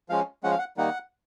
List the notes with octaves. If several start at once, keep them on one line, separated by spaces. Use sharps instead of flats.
F3 G#3 C#4 F5
F3 G#3 C#4 F#5
F5
F#5
D#3 G3 A#3 D#4 F#5